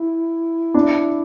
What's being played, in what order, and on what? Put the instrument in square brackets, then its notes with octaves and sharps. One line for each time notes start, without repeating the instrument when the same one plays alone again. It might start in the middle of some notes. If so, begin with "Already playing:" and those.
Already playing: [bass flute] E4
[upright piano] D4